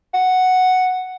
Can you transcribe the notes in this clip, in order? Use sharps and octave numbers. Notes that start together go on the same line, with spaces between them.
F#5